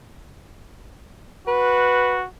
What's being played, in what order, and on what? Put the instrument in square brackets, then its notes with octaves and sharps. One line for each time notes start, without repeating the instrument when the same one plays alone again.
[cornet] F#4 [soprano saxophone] B4